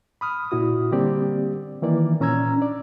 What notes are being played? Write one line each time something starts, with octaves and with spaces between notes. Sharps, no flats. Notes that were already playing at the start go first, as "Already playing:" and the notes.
B5 D#6 F6
A#2 E4 F#4 D#6
D3 G3 A#3 C4 G4 D5
D#3 E3 A#3 D5
A#2 C#4 A#5 E6 G#6
D4 D5